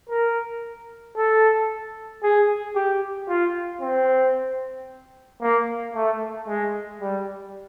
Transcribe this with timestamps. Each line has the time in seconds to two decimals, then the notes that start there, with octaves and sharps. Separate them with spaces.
0.10 A#4
1.17 A4
2.23 G#4
2.75 G4
3.29 F4
3.81 C4
5.42 A#3
5.94 A3
6.48 G#3
7.01 G3